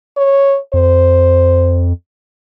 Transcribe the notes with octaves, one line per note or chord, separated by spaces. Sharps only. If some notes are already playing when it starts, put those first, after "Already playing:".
C#5
F2 C5